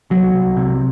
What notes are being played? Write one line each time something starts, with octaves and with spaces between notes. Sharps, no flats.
C2 F#3
C2
C3